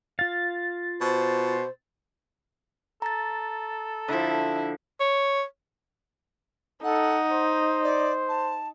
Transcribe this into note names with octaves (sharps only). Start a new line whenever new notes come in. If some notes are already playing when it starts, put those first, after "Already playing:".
F4 F5 A6
B2 C5
A4 A#5 A6
D3 F3 E4
C#5
D#4 A4 F#5
C5
D5
A5